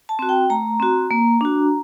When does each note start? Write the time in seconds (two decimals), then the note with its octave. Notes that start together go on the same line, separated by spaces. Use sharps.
0.09 A5
0.19 C4 F#4
0.29 G5
0.50 A3 A#5
0.80 C4 F#4
1.11 A#3
1.41 D4 F#4